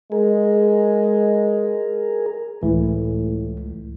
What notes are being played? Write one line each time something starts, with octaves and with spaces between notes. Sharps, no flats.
G#3 G#4 A#4
C#2 A2 E3